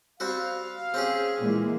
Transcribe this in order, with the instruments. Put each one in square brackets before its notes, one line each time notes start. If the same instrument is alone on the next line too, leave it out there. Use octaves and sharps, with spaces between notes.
[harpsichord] G3 C4 F#4 [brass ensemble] F5
[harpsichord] C4 C#4 G4 [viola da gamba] G#4
[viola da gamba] A#2 [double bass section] E3 G#3 A#3